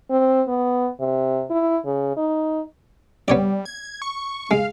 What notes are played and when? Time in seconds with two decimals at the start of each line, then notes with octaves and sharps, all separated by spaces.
0.10 C4
0.47 B3
1.00 C3
1.50 E4
1.85 C#3
2.16 D#4
3.28 G3 B3 C#5 D5
3.65 G#6
4.02 C#6
4.51 G#3 F5